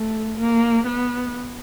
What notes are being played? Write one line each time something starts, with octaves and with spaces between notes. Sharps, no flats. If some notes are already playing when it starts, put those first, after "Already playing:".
Already playing: A3
A#3
B3